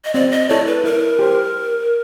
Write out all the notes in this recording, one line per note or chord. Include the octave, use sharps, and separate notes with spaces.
D#5
C4 D5
D#5
E4 A4 C#5 D5
B4
E4 A#4
G4 C5